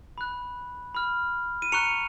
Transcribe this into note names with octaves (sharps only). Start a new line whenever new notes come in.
B5 F#6
B5 F6
D#7
A#5 C#6 F#6 C#7 F7